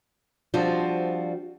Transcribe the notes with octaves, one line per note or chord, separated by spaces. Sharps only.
F3 G3 C4 D4 F4 F#4